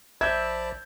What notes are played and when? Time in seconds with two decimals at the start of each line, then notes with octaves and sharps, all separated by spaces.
0.21 A#1 C5 D5 E5 A5 B5 G6 G#6